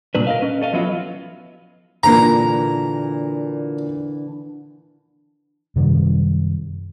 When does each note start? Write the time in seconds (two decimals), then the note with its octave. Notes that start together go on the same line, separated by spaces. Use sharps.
0.15 C2 A#2 D4 B4
0.27 A#4 D#5 F5
0.41 C#4 B4
0.62 A4 D#5 F5
0.73 F3 F#3 B3 E4 F4
2.03 A#2 D3 E3 A#3 A#5 A#6
5.76 F#2 C3 D#3 G3